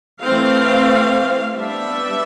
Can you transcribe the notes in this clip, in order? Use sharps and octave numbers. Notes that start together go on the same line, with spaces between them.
E3 A3 C4 F5
G3 B3 D4 E5